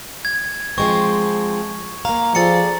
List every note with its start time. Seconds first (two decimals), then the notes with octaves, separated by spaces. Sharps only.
0.25 G#6
0.78 F3 G#3 C4 C#6
2.05 A#3 F5 A#5
2.35 F3 G#4 A4 D5 A6 C#7